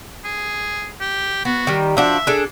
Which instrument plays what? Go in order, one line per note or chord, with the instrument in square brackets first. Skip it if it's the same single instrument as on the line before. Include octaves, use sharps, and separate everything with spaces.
[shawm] G#4
G4
[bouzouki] B3 [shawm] F#4
[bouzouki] D#3 G3
[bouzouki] F3 D4 F#4 [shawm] E5
[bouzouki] D4 G#4 A4